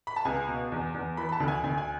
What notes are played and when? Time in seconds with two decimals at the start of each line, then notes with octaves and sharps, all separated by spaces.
0.07 B5
0.16 A5
0.25 C#2 G#5
0.48 B2
0.72 E2
0.94 E2
1.17 E3 B5
1.29 B5
1.32 A5
1.40 D2
1.48 G#5
1.64 D2 G#5
1.78 G#5